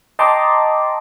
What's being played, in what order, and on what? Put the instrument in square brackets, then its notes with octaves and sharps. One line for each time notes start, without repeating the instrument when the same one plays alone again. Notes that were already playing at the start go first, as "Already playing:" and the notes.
[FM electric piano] D#5 G5 A5 A#5 C6 D6